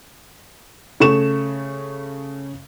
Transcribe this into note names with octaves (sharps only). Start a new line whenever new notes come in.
C#3 A3 C#6 E7